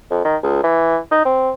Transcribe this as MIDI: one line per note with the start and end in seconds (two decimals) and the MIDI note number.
0.11 0.20 41
0.25 0.36 51
0.43 0.60 37
0.64 0.98 52
1.11 1.23 63
1.25 1.52 60